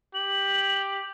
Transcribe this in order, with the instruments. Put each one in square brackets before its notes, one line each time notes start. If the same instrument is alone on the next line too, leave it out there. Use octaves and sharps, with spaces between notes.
[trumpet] G4 [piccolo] F#7